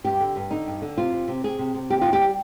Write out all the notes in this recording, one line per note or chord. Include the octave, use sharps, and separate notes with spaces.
G2 G4
D3
G2
D3 D#4
G2
D3
C3 F4
C3
C3
C3 G#4
C3
C3
D#2 G4
D#2 F4
G4
G3